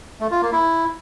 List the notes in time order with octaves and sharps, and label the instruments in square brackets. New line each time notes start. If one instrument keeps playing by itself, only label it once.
[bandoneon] A3
F4
A#3
E4